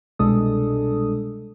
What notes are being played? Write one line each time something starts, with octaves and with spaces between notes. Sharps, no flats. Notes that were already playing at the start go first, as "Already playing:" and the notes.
C2 B2 G#3 D4 A4 D#6